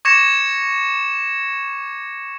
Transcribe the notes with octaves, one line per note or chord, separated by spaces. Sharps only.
C#6 D6 G#6 A#6 C#7 E7